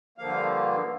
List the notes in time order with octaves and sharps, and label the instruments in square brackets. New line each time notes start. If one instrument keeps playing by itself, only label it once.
[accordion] G2 D3 F3 A#3 F5